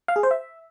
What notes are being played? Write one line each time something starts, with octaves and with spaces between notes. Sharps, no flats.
F5
G#4
C5
E5